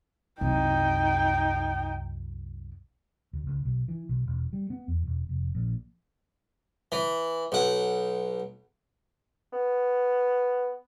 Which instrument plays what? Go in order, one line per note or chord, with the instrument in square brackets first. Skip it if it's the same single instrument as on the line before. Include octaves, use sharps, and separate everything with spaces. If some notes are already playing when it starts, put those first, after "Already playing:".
[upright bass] C2 F#2 [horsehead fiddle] D#4 G5
[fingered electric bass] D2
C#2
B1
E3
B1
E1
G3
B3
E2
E1
F1
A#1
[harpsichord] E3
B1 F#5
[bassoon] B3